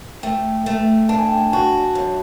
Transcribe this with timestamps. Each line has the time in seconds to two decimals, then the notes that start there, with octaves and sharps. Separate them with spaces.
0.23 A3 G5
0.66 A3
1.09 D4 A5
1.19 G#5
1.28 G5
1.38 G#5
1.53 F#4 A5
1.95 F#2